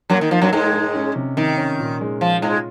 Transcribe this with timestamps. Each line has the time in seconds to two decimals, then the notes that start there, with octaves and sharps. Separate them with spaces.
0.10 F#2 F#3 A#3
0.21 D#3
0.31 F3 D#4
0.42 F#2 F#3
0.53 G#2 G#3 D#4
0.74 D#4
0.95 C#4
1.16 C3
1.37 C3 D#3
1.58 C#4
1.80 A#2
2.01 G#3
2.21 F3 F4
2.42 G#2 G#3 F4